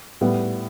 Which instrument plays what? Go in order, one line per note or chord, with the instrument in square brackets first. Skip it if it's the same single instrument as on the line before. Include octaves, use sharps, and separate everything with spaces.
[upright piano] A2 G3 B3